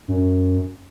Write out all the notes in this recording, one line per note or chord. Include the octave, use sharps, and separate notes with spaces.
F#2